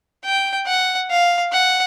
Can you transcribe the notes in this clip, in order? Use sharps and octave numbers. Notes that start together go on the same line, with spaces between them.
G5
F#5
F5
F#5